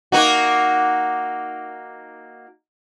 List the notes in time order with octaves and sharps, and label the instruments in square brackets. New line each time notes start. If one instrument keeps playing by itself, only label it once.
[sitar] A#3 D#4 F#4